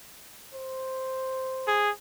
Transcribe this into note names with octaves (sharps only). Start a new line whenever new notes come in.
C5
G#4